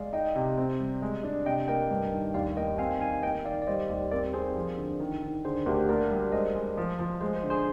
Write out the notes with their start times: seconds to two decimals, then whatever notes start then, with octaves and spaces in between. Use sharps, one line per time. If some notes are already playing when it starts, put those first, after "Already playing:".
Already playing: G#3 D5 F5
0.13 D#4 D#5 G5
0.36 C3
0.58 C4
0.80 G3
1.02 G#3
1.23 D4
1.46 C3 D#5 G5
1.68 A#3 D#5 G5
1.91 G2
2.13 D#3
2.34 D#2 D5 F5
2.57 A#3 D#5 G5
2.78 C4 F5 G#5
3.00 D#3 F5 G#5
3.23 A#3 D#5 G5
3.45 D#3 D5 F5
3.62 D5
3.67 G3 C5 D#5
3.89 D#2
4.11 C4 A#4 D5
4.33 C4 G#4 C5
4.55 F3
4.77 D3
4.99 D#3
5.23 D#3
5.45 D3 G#4 C5
5.66 D2 G4 A#4
5.89 A#3 A#4 D5
6.10 G3
6.32 G#3 C5 D#5
6.55 G#3
6.77 F3
6.99 F3
7.21 G#3 G#4 C5
7.35 G#4 C5
7.43 D3
7.50 G#4 C5